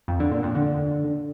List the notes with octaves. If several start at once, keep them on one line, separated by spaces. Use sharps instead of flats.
F2
D3
A#2
F2
D3